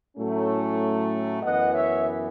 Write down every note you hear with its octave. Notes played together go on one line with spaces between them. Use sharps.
A2 F#3 A3 C#4
F#2 E3 B3 D#5 F#5
C#5 E5